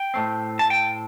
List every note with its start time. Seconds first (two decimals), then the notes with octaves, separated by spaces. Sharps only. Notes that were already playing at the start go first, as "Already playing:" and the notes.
Already playing: G5
0.14 A2 A3 C4
0.59 A5
0.70 G5